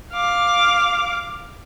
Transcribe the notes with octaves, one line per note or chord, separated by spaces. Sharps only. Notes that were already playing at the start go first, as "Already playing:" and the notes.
F5 D6